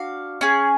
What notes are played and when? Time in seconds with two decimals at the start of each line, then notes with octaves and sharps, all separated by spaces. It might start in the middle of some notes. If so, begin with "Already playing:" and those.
Already playing: D4 F#4 F5
0.41 C#4 G#4